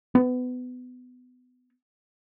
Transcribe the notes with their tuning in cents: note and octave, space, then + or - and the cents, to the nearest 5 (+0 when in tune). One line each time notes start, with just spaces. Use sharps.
B3 +25